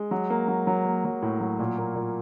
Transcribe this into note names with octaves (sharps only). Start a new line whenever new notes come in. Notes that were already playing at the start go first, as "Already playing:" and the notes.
Already playing: G#3
F#3
A#3
F#3
F#3
A#3
F#3
A2
F#3
A#2
A#3
A#2